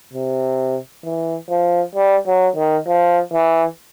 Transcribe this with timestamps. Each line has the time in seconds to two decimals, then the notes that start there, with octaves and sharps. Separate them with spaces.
0.13 C3
1.05 E3
1.50 F3
1.95 G3
2.27 F#3
2.56 D#3
2.87 F3
3.33 E3